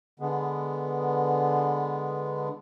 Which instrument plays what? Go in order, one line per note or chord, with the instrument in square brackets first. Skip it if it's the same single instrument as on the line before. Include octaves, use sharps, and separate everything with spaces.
[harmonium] D3 G#3 B3